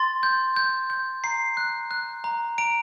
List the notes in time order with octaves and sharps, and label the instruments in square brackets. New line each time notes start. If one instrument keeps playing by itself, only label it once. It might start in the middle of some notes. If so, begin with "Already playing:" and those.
Already playing: [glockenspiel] C6 A6
G6
G6
G6
A#5 C7
F#6
F#6
A#5
A#5 D7